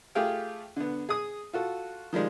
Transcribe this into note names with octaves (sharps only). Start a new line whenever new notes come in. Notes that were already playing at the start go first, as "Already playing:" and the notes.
A3 F4 G4 G#4 F5 G5
D3 B3
G#4 D#6
F4 F#4 A4
D#3 F3 G3 G#3